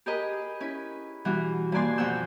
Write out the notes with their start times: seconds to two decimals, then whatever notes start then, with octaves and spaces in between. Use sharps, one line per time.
0.06 G4 G#4 A#4 B4 D#5
0.60 C#4 E4 B4
1.25 B2 E3 G3 F#4
1.72 G2 D#3 A#3 D5 G#5 C6
1.98 F2 B2 B3 F#5 E6 G6